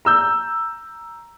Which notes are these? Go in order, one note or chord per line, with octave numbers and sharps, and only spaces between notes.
A#5 E6 G6